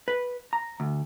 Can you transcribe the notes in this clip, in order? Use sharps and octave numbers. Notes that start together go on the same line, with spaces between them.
B4
A#5
D2